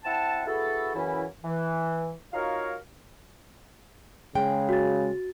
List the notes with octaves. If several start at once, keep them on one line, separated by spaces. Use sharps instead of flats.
C4 E4 F#5 A5
B3 E4 F#4 G#4 A4
F#2 C#3 E3 C#4 E4
E3
D#4 F4 F#4 A#4 C#5 F5
C#3 G#3 G5
F#4 A6